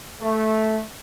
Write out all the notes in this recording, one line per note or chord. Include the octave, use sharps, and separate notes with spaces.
A3